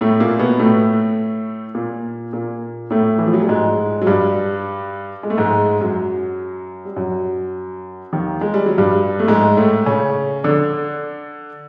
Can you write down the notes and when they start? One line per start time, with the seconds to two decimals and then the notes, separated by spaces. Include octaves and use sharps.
0.01 A2 A3
0.20 A#2 A#3
0.39 B2 B3
0.59 A2 A3
1.75 A#2 A#3
2.33 A#2 A#3
2.90 A2 A3
3.18 E3
3.27 F3
3.34 F#3
3.42 G3
3.48 G#2 G#3
4.01 F#3
4.07 G2 G3
5.23 G#3
5.30 A3
5.38 G#2 G#3
5.80 F#2 F#3
6.85 G3
6.96 F#2 F#3
8.13 D#2 D#3
8.41 G#3
8.54 G3
8.66 F#3
8.78 G2 G3
9.19 A3
9.28 G#2 G#3
9.57 A2 A3
9.86 C#3 C#4
10.44 D3 D4